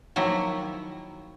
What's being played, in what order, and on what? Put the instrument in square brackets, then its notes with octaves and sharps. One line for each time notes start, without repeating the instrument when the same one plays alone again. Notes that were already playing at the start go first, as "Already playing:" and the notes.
[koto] D#3 F3 F#3 A#3 E4